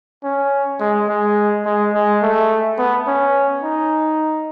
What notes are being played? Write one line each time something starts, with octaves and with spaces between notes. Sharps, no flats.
C#4
G#3
G#3
G#3
G#3
A3
B3
C#4
D#4